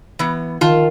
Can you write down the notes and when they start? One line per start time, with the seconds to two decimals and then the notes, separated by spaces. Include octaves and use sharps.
0.19 E3 B3
0.61 D#3 F4 A5